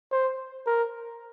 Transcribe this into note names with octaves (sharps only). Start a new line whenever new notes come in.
C5
A#4